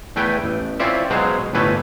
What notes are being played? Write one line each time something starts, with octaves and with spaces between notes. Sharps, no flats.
E2 A3 B4 G5 G#5
A1
C4 C#4 E4 F4 D5 E5
B2 F#3 G#3 G#4 C5 F5
G1 A2 E3 A3 B4 G#5